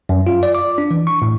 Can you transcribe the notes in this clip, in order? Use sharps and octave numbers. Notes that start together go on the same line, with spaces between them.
F#2
F4
D5
D6
D4
E3
C#6
A2